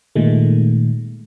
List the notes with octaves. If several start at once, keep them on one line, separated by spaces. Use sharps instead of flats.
A#2 D#3 G#3 A3